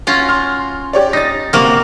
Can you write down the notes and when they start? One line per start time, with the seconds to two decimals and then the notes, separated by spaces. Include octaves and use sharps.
0.07 C#4 F4 F#4
0.29 C6 F6
0.93 G4 C#5 D5
1.13 D#4 A6 A#6
1.53 C3 A#3 C4 F#4 F6